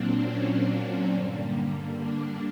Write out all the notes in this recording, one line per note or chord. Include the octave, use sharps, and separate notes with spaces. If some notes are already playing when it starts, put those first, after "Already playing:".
Already playing: A#2 F#3 A#3 C4 D4
C#4
D4
G2 D3 G3 A#3
D4